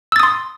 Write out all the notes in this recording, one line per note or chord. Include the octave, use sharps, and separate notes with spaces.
C6 D#6 E6 A6